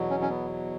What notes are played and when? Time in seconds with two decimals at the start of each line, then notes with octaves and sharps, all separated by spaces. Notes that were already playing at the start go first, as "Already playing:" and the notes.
Already playing: E2 B2 F#3
0.10 C#4
0.22 C#4
0.29 B3